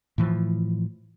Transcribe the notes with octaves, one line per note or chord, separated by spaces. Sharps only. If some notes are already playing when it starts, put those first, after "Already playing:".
A2 E3 F3